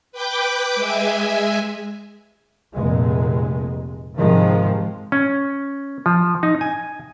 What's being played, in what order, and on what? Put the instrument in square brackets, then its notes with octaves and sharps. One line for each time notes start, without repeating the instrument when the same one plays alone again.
[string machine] B4 G5 D6 G6
G#3 E5 G#5
[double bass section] F1 A#2 G#3
G#2 C3 D#3 F3 G#3
[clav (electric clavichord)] C#4
F3
D#4
G#5